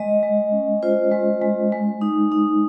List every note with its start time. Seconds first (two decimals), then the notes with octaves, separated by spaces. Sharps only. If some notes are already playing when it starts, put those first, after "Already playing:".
Already playing: G#3 D#5
0.23 G#3
0.52 C#4
0.83 F4 C5
1.12 G#3
1.42 G#3
1.72 G#3
2.01 D#4
2.32 D#4